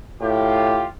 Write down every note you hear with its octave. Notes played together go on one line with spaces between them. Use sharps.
A2 F4 G4